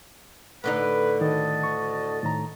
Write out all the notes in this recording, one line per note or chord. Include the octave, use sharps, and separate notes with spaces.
A2 D3 D#4 B4
D2 D#3 D#5 A5
C#6
A2 D#3 A#5